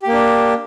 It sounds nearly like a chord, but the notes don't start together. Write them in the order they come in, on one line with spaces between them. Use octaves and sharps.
G4 A#3 D4